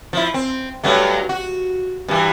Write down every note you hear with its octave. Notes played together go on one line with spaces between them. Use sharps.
F3 E4
C4
G2 F#3 A3
F#4
G2 E3